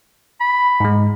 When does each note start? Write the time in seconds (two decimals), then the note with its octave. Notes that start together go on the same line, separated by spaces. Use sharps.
0.41 B5
0.80 G#2 G#3